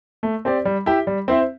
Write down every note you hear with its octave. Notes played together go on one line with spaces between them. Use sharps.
A3
C4 G4 D5
G3
E4 G4 E5
G3
C4 E4 C5 E5